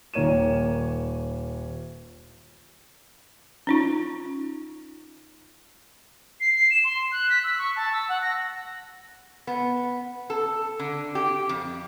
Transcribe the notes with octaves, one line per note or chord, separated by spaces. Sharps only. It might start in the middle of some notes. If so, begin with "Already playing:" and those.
D#1 D#3 A#3 C#5 D#7 E7
C#4 D#4 F4
C7
C7
E7
C6
F#6
B6
E6
C#6
A5
E6
F#5
A#6
B3
A4
D3
G4
F2